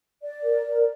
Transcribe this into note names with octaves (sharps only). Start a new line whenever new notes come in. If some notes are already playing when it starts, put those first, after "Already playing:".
D5
A#4
A#4